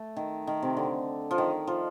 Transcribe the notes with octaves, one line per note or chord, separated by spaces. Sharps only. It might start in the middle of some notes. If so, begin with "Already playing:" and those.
Already playing: A3
D#3
D#3
C3
D3
F3
D#3
F3